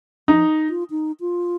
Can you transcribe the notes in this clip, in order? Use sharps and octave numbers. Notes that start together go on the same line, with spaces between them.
F3 D#4
F4
D#4
F4